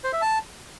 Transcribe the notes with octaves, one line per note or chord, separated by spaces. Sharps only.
C5
E5
A5